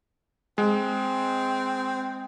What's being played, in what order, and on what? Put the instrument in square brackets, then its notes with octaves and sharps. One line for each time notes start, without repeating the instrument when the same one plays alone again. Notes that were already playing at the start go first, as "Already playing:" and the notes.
[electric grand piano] G#3 [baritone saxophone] C4